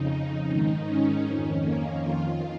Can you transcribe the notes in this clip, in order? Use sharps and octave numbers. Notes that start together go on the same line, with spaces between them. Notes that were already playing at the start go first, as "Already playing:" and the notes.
Already playing: F2 C#3 D#4
D#4
G#2 D#3
C#4
F2 D#3
A#3
F2 D#3 F4